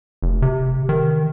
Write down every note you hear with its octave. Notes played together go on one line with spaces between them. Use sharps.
F1
C3
D#3